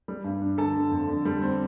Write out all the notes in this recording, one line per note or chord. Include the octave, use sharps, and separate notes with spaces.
G3
G2
D4
D3 A4 A5
D3
F2
D3
G3
C4